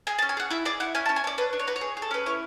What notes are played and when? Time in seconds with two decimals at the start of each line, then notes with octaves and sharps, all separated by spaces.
0.07 G#4 G#5
0.19 A5
0.22 C#4
0.29 G#5
0.37 G#4 F#5
0.50 E4 E5
0.65 G#4 D5
0.80 E4 F#5
0.95 C#4 G#5
1.06 A5
1.09 C#4
1.16 G#5
1.24 C#4 D5
1.38 D4 B4
1.53 D4
1.59 C#5
1.67 F#4 B4
1.76 C#5
1.81 G#4
1.97 G#4
2.02 A4
2.11 C#4 B4
2.26 E4 C#5